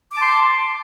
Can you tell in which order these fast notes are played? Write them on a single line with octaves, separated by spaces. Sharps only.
D6 A5 C6